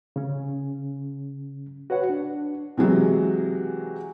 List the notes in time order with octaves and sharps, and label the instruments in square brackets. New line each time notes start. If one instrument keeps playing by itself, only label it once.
[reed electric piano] C#3 C#4
F#4 B4 C#5 F#5
D4
[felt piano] C3 E3 F#3 G#3